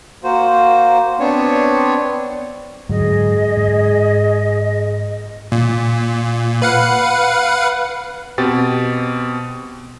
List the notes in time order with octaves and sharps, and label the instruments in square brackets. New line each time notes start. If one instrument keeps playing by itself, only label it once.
[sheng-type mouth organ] A#3 F#4 C5
B3 C4 D4 C#5
[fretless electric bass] G#2 D3 F#3 [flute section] G#4 D#5
[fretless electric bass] G#2
[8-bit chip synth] A#2
B4 F5 F#5
[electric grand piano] B2 C4 G4 A6